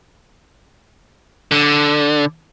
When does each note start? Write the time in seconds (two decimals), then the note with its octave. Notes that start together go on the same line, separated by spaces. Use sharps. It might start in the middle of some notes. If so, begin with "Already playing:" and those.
1.51 D3